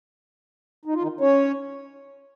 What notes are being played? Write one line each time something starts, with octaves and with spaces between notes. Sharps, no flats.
D#4
F4
D#3 D#4
C#4 C#5